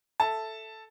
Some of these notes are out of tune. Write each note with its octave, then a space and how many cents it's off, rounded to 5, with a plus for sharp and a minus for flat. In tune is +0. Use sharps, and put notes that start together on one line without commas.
A4 +0 E5 +0 A5 +0